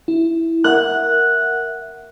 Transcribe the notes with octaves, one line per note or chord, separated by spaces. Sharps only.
E4
A#4 E5 F#5 F#6